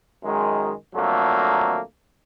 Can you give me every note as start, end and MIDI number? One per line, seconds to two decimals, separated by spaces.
0.23 0.71 42
0.23 0.71 51
0.23 0.71 56
0.95 1.78 41
0.95 1.78 50
0.95 1.78 54
0.95 1.78 57
0.95 1.78 58